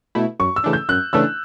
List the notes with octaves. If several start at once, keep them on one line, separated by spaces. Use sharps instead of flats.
B2 A3 E4
F#2 C#6
E6
C#3 E3 A3 D4
G6
F#2 F#6
C#3 E3 A3 D4 E6